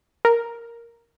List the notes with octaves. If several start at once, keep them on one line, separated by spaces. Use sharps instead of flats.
A#4